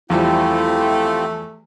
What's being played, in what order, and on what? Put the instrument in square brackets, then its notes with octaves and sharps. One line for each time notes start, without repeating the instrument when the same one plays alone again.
[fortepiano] E2 F3 G3 [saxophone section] A3 [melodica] C4 F4 G4 [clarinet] E4